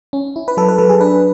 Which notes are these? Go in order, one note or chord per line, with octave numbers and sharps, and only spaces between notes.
C#4
E4
B4
F#3 A4
B4
F#3 A4
G#4
D4 B4